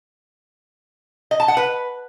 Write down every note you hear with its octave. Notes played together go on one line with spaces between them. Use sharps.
D#5
A5
F#5
B4